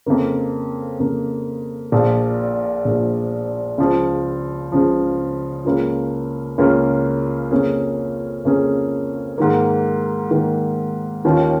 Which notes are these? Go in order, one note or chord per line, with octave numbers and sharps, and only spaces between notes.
F2 C#3 A#3
F2 C#3 A#3
A#1 A#2 F3
A#1 A#2 F3
C#2 C#3 F3
C#2 C#3 F3
C#2 C#3 A#3 C#4 F4
C#2 C#3 A#3 C#4 F4
F2 C#3 A#3 C#4 G#4
F2 C#3 A#3 C#4 G#4
G#2 D#3 A#3
G#2 D#3 A#3
D#2 D#3 C#4 F4